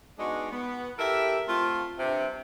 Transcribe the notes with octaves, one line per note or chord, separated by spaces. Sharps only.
G#3 B3 D4 D#4 F#4
B3
E4 G4 A4 A#4 E5
A3 C4 F4
G2 C3